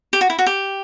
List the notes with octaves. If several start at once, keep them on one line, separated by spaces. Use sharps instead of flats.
G4
F#4
E4
F#4
G4